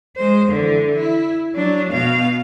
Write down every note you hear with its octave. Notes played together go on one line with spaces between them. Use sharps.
G#3 C5
D3 E3
E4
F#3 D4
B2 F5